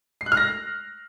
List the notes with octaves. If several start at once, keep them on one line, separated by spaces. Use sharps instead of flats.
C7
F#6
F6
A#6